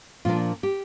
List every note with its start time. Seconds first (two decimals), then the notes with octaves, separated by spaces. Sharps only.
0.25 A#2 F3 A#3 D4 F4
0.63 G4